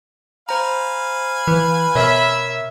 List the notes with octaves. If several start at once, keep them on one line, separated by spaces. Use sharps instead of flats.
C5 F5 G#5 A#5 B5
E3 B4
B2 A#4 C#5 E5